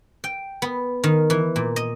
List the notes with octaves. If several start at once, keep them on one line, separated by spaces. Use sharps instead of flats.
G5
B3
D#3
E3
A#2
D#5